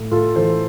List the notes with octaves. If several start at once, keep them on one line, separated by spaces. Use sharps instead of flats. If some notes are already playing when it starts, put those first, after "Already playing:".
Already playing: A2
A2 F4 A4
E3 A4 C5